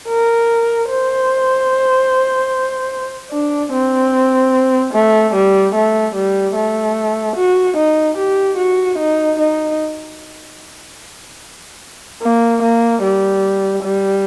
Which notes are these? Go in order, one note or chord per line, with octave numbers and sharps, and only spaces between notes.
A#4
C5
D4
C4
A3
G3
A3
G3
A3
F#4
D#4
G4
F#4
D#4
D#4
A#3
A#3
G3
G3